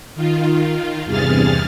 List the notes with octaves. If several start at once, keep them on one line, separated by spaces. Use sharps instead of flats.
D#3 F4
E2 G2 C3 G#4 F6 A6